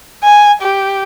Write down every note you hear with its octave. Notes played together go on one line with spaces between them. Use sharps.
G#5
G4